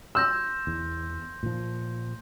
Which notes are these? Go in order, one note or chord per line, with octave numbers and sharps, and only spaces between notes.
C6 E6 G6 A#6
E2
A#2 F3